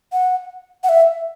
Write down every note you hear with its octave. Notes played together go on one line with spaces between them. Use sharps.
F#5
F#5
E5